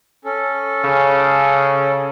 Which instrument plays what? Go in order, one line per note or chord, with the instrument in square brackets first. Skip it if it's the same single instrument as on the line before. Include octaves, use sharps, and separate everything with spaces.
[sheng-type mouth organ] C#4 A4
[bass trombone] C#3